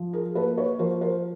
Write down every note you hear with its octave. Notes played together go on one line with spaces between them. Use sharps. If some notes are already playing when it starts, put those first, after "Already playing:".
Already playing: F3
G#4 A#4
A#3 A4 B4
B4 C#5
F3 A#4 C5
A#4 C5